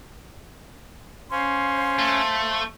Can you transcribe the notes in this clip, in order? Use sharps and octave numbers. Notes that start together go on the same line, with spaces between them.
C#4 C5 F5 C6
A3